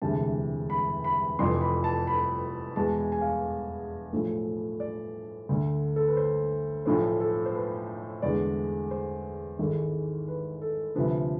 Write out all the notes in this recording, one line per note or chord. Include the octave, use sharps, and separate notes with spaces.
E1 D2 C3 E3 G#3 A5
B5
B5
F1 F2 E3 C6
B5
A5
B5
E2 B2 G#3 A5
G#5
G#5
F5
B1 A2 F3 A3
D5
D2 D3 A3
A4
B4
C5
B1 A2 F3 A3 C5
A4
C5
B4
E2 D3 G#3 D5
C5
G#1 G#2 E3 G#3 A4
B4
A4
D2 C3 F3 B4